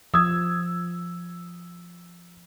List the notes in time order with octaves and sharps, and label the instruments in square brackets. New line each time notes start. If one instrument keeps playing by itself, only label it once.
[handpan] F3 [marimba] D#6 [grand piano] E6 G#6